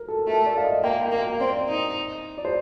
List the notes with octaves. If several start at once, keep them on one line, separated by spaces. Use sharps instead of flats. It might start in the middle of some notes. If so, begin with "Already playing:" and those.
Already playing: A#4
A4
A3 A#4
D5
F5
D#5
A#3 G5
G5
A#3
F5
C4 D5
D#4
D5
C5